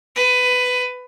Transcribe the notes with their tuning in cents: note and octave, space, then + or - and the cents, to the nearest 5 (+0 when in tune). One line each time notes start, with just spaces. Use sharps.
B4 +15